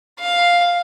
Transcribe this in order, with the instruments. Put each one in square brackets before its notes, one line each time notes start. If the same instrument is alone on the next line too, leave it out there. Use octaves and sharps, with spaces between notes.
[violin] F5